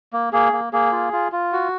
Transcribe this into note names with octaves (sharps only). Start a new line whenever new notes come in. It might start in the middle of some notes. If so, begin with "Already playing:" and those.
A#3
A#3 G#4
A#3
A#3 G#4
F4
F4
F4
F#4